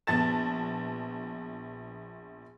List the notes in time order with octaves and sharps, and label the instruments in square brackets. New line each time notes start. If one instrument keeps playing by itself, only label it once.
[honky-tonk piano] A#1 B3 A5 A6 E7